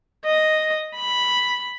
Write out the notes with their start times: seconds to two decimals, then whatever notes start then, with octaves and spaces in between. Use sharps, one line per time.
0.25 D#5
0.96 B5